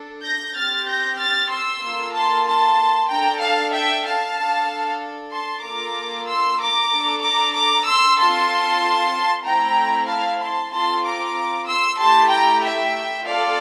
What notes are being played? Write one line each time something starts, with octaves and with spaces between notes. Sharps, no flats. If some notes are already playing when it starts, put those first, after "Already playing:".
Already playing: D4 A4
G6 A#6
C4 G4 F6 A6
G6 A#6
F6 A6
C6 E6
A#3 F4 A4
A5 C6
A5 C6
D4 A4 G5 A#5
F5 A5
E5 G5
F5 A5
D4 A4
A5 C6
A#3 F4 A4 A#5 D6
C6 E6
A#5 D6
D4 A4
A#5 D6
A#5 D6
C6 E6
C4 F4 A4 A5 C6
A3 C4 E4 G5 A#5
F5 A5
A5 C6
C4 F4 A4 A5 C6
A#5 D6
C6 E6
A3 E4 G4 A5 C6
G5 A#5
E5 G5
C4 F4 A4 D5 F5